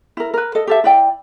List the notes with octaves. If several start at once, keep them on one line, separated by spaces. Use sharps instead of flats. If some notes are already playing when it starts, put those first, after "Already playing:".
E4 A#4
A#4 B4
A4 D#5
G4 A4 E5
E4 D5 G5